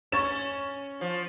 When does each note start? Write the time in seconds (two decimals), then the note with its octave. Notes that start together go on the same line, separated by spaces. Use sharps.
0.12 C#4 C#6 A6 E7
1.01 F3